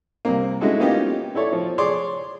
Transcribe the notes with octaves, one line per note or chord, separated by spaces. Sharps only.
C2 C3 A#3
G#3 C#4 D#4 E4 F#4 A4
A#3 B3 C#4 D#4 F4 G4
E4 A4 C#5 D5
F3
G#4 C#5 D5 C6 D6